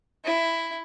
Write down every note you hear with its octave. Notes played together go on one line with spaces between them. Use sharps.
E4